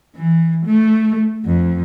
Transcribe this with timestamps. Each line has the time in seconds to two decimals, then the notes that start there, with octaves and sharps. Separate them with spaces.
0.16 E3
0.66 A3
1.45 F2